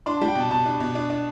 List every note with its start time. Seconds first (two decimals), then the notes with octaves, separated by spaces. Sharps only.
0.06 D4 C6
0.17 G3 A5
0.28 G5
0.35 B2 A5
0.50 B2 A5
0.66 D4
0.80 B2
0.95 D4
1.10 D4